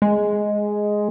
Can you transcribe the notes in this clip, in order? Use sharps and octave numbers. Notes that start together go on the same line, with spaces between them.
G#3